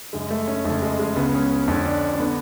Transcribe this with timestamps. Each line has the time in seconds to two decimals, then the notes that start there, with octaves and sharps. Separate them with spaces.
0.13 F#2 C#3 G#3
0.30 A3
0.48 C#4
0.65 F2 C#3 A3
0.82 G#3
0.99 G#3
1.16 C#2 C#3 B3
1.34 C#4
1.68 F2 D3 C#4
1.86 D4
2.14 C#4
2.19 D3 B3